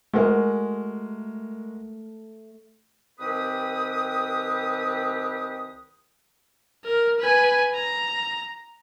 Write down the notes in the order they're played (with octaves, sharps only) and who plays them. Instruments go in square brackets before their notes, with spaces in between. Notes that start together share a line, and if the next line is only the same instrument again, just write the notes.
[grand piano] G#3 F#4 A#4 [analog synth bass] A3
[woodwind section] C2 D#3 C4 G4 B4 D#6
[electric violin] A#4
B4 G#5
A#5